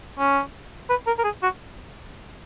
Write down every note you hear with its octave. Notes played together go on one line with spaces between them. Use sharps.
C#4
B4
A#4
A#4
G#4
F#4